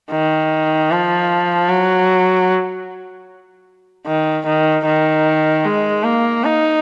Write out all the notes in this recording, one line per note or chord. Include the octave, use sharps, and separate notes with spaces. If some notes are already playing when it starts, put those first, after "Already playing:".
D#3
F3
F#3
D#3
D#3
D#3
G#3
A#3
D#4